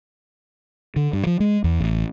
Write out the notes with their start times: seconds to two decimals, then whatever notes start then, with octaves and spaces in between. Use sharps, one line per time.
0.96 D3
1.13 G2
1.27 F3
1.40 G#3
1.64 E2
1.80 A1